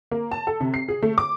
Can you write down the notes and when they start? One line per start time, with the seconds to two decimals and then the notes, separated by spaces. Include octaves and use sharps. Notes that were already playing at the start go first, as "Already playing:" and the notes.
0.11 A#3
0.31 A5
0.47 A4
0.60 C3
0.74 C7
0.89 G#4
1.03 A3
1.18 D6